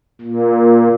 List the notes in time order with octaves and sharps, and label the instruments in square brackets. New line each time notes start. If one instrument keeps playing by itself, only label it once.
[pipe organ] A#2